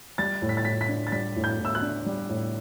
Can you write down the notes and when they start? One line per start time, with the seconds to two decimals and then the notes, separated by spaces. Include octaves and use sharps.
0.18 G3 A6
0.42 A2
0.49 B6
0.57 A6
0.65 A2 B6
0.81 B6
0.89 D4
1.07 A6
1.12 G3 B6
1.36 A2
1.44 G6
1.59 A2
1.65 E6
1.75 F#6
1.82 D4
2.06 G3
2.29 A2